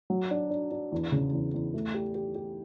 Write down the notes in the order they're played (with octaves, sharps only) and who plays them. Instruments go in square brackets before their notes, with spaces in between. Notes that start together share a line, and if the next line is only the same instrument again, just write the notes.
[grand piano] F#3
D4
D4
D4
E2
C#3
E2
E2
A3
G4
G4
G4